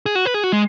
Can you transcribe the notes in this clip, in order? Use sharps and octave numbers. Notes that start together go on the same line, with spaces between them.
G#4
F#4
B4
G#4
F#4
G#3